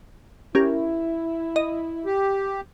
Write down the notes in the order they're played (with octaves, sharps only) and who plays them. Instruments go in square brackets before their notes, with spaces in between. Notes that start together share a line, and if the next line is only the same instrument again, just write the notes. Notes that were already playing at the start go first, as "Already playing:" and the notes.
[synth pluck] C#4 G4 A#4 [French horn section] E4
[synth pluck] D#5
[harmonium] G4